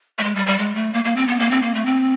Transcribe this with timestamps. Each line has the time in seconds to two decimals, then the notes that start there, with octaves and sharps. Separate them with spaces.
0.19 A3
0.24 G#3
0.35 G3
0.47 G3
0.58 G#3
0.75 A3
0.93 A#3
1.05 A#3
1.16 C4
1.28 B3
1.40 A#3
1.51 C4
1.62 A#3
1.75 A3
1.86 C4